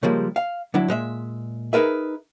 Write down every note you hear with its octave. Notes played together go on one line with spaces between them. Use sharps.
C#3 F3 G3 G#3 A#3
F5
D3 F#3 D4 E4
A#2 G#3 E5
D#4 G#4 A#4 B4 E5